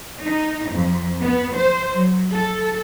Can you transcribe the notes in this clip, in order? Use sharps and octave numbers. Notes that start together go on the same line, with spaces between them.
D#4
F2
B3
C5
F#3
A4